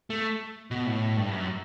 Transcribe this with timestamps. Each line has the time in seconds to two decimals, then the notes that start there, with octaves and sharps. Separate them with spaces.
0.10 A3
0.71 B2
0.87 A2
1.17 G2
1.32 F#2